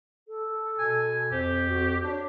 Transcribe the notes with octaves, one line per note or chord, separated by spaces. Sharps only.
A4
B2 G#5
F2 G4 C5
F2 F#4
D4 C#5